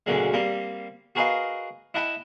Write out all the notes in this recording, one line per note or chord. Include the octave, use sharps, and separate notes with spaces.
D2 A#2 C#3 F#3 G#3
G3 A#3 C4
F#4 G#4 A#4 B4 D#5 F5
E4 D#5 F#5 G5 A5 B5